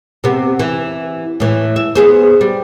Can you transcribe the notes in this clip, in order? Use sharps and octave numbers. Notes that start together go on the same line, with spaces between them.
C3 B3
E3
A2 E3
E5
B3 G#4 C5
G3